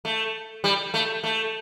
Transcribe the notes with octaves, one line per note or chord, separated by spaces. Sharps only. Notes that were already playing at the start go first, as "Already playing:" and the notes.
A3
G3
A3
A3